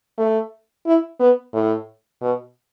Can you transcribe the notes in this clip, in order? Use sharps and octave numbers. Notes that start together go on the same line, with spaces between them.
A3
E4
B3
A2
B2